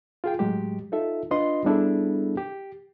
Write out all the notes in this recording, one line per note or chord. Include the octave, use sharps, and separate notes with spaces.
F4 G#4 G5
A2 F#3 G#3 G4
D#4 F4 A4 E5
D4 F4 B4 D#5 C6
G3 B3 D4 E4 G#4 A4
G4